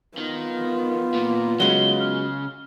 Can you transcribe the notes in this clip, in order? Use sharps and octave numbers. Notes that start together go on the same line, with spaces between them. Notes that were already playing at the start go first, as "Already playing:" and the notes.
D#3 B3 F4
A#2
C#3 F#3 G#3 G7
F6